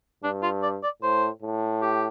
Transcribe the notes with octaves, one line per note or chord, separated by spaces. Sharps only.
G2 D4
F4
D5
D5
A2 C5
A2
G4